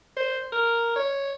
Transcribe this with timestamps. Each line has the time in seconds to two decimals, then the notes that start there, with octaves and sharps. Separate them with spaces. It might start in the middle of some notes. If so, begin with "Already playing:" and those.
0.17 C5
0.52 A#4
0.96 C#5